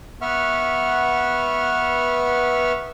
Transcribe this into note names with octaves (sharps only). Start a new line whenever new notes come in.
B3 B4 E5 F#5 C#6 F6